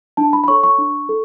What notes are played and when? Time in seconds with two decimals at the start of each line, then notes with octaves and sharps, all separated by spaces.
0.17 D4 A5
0.33 B5
0.44 B5
0.48 A4 C#5 C#6
0.63 C#6
0.78 D4
1.09 A4